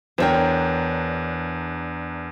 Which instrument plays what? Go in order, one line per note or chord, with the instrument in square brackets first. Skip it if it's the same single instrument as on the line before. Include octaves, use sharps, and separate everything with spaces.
[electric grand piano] E2 D4 A#4 [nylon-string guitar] C5 C#5 G5